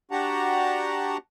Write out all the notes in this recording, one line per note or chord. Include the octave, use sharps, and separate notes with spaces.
D4 F#4 G4 F#5 A5 A#5